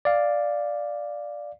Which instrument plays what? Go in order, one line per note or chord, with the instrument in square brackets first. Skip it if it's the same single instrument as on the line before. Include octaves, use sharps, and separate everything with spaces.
[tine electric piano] D5 F5